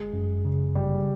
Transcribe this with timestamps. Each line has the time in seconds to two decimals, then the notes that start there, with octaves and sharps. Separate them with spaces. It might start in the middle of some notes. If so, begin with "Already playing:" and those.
Already playing: G1 G#3
0.13 F#2
0.45 C#3
0.75 G1 G3